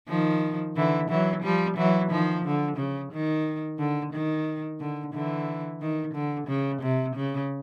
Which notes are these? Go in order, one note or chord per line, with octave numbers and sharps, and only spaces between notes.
D#3 F3
D3 E3
E3 F#3
F3 G3
E3 F#3
D#3 F3
D3
C#3
D#3
D3
D#3
D3
D3 E3
D#3
D3
C#3
C3
C#3